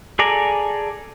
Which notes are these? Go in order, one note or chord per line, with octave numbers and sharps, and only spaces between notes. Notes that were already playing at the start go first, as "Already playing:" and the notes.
G#4 A4 D5 G#5 A#5